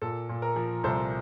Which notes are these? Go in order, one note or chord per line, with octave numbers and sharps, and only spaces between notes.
A#2 A4
A#2
A#4
F3
C2 A4 C5